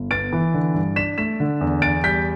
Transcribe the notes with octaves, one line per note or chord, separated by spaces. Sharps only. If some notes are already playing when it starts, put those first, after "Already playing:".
Already playing: G1
B3 A6 D7
E3
D3
G2
D4 B6 E7
A3 B6 E7
D3
E2
E2 A6 D7
G3 G6 B6